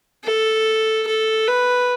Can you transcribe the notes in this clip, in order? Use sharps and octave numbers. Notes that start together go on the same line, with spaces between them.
A4
A4
B4